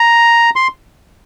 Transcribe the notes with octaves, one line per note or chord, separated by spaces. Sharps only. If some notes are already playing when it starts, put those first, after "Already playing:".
Already playing: A#5
C6